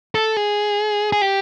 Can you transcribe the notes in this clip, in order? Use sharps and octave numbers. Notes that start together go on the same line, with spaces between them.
A4
G#4
G#4
G4